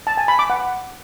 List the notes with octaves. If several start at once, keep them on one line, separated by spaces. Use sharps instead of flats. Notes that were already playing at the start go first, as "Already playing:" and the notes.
A5
G#5
B5
D6
F#5